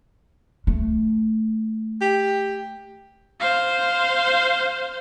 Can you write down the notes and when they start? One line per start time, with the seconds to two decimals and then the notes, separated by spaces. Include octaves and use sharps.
0.67 A3
2.01 G4
3.41 C5 F5